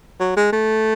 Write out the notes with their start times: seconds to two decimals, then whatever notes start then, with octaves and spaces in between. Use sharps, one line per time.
0.20 F#3
0.36 G#3
0.52 A3